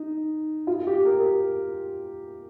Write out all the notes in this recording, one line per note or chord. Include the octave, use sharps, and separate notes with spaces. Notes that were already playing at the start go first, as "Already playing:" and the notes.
Already playing: D#4
F4
G4
A#4